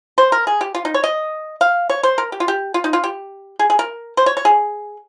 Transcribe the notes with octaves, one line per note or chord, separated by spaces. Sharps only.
C5
A#4
G#4
G4
F4
D#4
C#5
D#5
F5
C#5
C5
A#4
G4
F4
G4
F4
D#4
F4
G4
G#4
G#4
A#4
C5
C#5
C#5
G#4